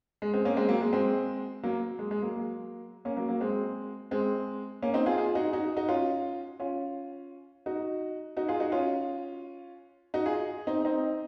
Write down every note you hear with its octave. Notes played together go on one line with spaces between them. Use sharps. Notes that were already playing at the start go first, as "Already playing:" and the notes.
G#3
G#3 C4
A#3 C#4
G#3 C4
F#3 A#3
G#3
G#3 C4
F#3 A#3
G#3
G#3
F#3 A#3
A#3 C#4
F#3 A#3
F#3 A#3
G#3 C4
G#3 C4
A#3 C#4
C4 D#4
F4 G#4
F4 G#4
D#4 F#4
D#4 F#4
D#4 F#4
C#4 F4
C#4 F4
D#4 F#4
D#4 F#4
F4 G#4
D#4 F#4
C#4 F4
D#4 F#4
F4 G#4
C4 D#4
C4 D#4